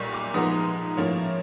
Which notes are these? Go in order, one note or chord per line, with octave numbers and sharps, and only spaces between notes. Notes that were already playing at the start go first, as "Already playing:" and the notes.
Already playing: B1 A#2 G3 C#6
D6
G#2 F3 G#3 B3 D#4 D#6
A2 F3 A#3 C#4